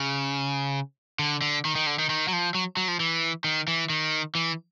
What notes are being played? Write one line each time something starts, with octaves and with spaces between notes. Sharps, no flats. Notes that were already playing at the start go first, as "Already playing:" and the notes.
Already playing: C#3
D3
D3
D#3
D#3
D3
D#3
D#3
F#3
F3
F#3
F#3
F3
E3
D#3
E3
D#3
E3